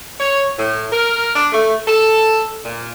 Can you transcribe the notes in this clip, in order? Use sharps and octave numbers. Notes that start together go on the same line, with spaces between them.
C#5
A2
A#4
D4
A3
A4
A#2